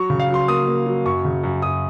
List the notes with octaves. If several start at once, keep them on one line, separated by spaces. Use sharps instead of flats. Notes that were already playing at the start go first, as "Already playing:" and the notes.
Already playing: F#3 C#6
C#3
F5
F#3 C6
A#3 D#6
A#3
F#3
F#2 C#6
C#3
F#2
F#2 D#6